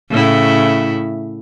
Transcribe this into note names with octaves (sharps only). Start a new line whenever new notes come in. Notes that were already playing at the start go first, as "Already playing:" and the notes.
A2 C#3 E4